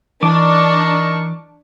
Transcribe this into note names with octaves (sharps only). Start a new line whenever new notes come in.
E3 D4 D#4 A#4 C#6 D6